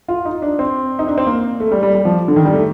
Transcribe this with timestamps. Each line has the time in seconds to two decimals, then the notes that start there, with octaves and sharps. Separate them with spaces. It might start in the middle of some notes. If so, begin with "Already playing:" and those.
0.09 F4
0.25 D#4
0.42 D4
0.59 C4
0.99 D#4
1.07 D4
1.18 C4
1.27 A#3
1.60 A3
1.72 G3
1.83 G3
1.95 G3
2.05 F3
2.28 D3
2.36 D#3
2.45 G3
2.53 A3